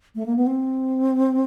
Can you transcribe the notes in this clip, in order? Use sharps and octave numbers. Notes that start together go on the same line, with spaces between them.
A3
A#3
B3
C4